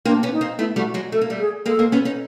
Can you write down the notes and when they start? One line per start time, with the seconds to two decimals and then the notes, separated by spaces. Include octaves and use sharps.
0.05 A#3 C4 D4
0.23 B3 C#4
0.32 D#4
0.41 A#3 C4
0.58 A3 B3 E4
0.76 G3 A3 F#4
0.94 F#3 G#3
1.12 A3 A4
1.21 A#3
1.30 G3 A3
1.39 G#4
1.66 G#3 A#3 A4
1.79 A#3 C4
1.92 B3 C#4
2.05 C#4 D#4